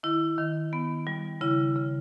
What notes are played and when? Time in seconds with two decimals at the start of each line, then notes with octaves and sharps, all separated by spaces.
0.03 D#3 E4
0.38 D#3
0.73 B3
1.07 G3
1.41 C#3 E4
1.76 C#3